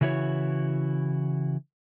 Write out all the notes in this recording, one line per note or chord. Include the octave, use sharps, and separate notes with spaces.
C#3 E3 E4 F#4 C#5